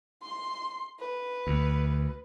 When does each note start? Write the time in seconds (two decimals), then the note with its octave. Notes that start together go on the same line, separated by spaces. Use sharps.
0.22 C6
0.99 B4
1.47 D2